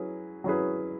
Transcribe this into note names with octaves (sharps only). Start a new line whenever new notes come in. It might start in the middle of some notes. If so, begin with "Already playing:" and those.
Already playing: F#3 C#4 E4 G#4 B4
F#3 C#4 E4 G#4 B4